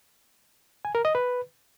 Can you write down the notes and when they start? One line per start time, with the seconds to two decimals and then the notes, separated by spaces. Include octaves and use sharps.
0.85 G#5
0.95 A#4
1.05 D#5
1.15 B4